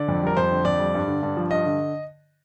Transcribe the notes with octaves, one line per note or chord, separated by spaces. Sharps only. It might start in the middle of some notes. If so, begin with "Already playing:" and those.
Already playing: D3 D5
F2
G3 A#4
F2 C5
D3
F2 D5
G3
G2
D3
G2
F3
G2 D#5
D3